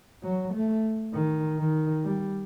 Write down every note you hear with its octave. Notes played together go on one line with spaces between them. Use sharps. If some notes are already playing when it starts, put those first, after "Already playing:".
F#3
A3
D#3
D#3
G3